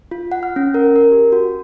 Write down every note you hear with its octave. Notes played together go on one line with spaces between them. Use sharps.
F4
F#5
F6
C#4
A#4
A#4
G4
F#4